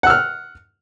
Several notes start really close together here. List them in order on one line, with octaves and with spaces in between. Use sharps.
F#5 E6 F6